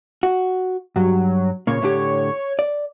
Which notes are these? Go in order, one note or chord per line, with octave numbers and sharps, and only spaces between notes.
F#4
G2 F#3
A#2 C#3 A#3 C#5
A2 D3 G4
D5